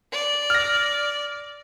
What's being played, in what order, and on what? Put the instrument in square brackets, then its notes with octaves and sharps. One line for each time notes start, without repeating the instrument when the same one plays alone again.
[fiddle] D5
[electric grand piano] F6 A#6